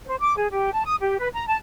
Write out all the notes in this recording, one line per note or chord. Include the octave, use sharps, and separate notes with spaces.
C5
D6
G#4
G4
A5
D#6
G4
B4
A#5
A5